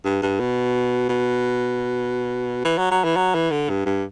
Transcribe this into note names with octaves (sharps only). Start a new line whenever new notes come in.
G2
G2
B2
B2
E3
F#3
F#3
E3
F#3
E3
D3
G2
G2